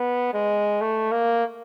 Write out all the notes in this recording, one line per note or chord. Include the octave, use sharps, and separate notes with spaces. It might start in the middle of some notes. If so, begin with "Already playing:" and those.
Already playing: B3
G#3
A3
A#3